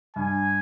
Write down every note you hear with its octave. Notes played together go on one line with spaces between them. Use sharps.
G2 G#5